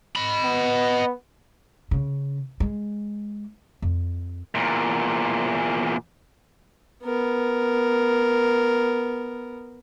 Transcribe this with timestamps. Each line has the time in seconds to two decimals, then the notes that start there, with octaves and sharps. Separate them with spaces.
0.16 D#5 B5
0.44 B3
1.91 C#3
2.60 G#3
3.82 F2
4.55 E2 A#2
7.03 B3 A#4